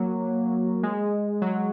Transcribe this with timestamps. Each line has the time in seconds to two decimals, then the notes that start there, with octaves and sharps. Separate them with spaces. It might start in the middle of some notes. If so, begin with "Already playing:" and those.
Already playing: F#3 A#3
0.83 G#3
1.42 F#3